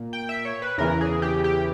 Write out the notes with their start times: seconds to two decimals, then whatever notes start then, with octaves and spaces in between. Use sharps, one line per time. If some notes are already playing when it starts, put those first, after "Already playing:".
Already playing: A#2
0.13 G5
0.29 E5
0.45 C#5
0.62 B4
0.78 E2 C#3 E3 A#4
1.01 G#4
1.22 G4
1.44 G4